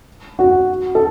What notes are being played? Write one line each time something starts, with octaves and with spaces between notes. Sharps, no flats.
F#4
A4